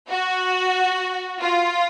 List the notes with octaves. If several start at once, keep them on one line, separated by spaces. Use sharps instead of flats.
F#4
F4